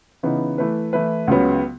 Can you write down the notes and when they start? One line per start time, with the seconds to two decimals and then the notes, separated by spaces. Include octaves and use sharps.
0.23 C#3 E3 B3 D#4
0.58 E3 A3 E4 B4
0.93 E3 A3 E4 B4
1.28 C#2 C#3 F#3 B3